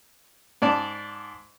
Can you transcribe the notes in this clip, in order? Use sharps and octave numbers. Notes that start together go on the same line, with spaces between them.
G#2 D5 A5